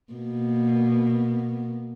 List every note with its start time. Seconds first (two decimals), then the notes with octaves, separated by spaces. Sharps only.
0.13 B2 A#3